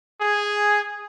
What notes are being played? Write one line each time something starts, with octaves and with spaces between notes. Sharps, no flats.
G#4